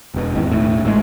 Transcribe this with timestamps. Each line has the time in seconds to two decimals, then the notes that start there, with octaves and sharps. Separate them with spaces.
0.14 E1 B2
0.35 G#1 E2 D#3
0.50 E1 A2
0.85 A1 A2 C3 G#3